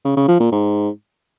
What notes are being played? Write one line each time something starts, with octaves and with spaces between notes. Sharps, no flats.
C#3
C#3
F3
A#2
G#2